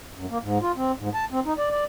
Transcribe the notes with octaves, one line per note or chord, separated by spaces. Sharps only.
F#2
A#3
G#2
F4
C4
G#2
A5
C4
D#4
D5
D5